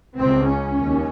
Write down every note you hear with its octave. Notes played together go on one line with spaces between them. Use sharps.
C#2 C#3 C4
C#4
D#2